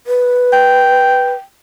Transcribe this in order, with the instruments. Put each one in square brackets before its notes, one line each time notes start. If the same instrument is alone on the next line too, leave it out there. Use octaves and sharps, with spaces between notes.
[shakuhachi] B4
[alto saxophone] G5